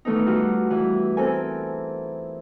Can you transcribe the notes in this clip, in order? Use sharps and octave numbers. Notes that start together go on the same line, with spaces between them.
D#3 E3 A3 B3 D#4
G3 F4 F#4 F#5
E3 G3
C4 A4 A#4 G#5